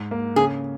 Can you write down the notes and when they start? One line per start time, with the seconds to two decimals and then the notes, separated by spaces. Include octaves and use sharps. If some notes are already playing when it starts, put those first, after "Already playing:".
Already playing: G#2
0.11 A#3
0.36 C#3 G#4